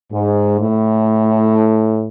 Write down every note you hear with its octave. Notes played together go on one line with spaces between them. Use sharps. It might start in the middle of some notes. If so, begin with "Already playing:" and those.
G#2
A2